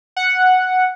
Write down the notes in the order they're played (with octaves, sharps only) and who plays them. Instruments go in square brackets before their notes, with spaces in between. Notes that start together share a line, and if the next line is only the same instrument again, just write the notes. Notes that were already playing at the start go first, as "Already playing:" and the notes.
[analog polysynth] F#5